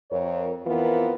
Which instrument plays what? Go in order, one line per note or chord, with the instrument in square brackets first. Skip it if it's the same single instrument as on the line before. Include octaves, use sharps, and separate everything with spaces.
[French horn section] F2 A#4 C#5
F2 E3 B3 C4 F4 A#4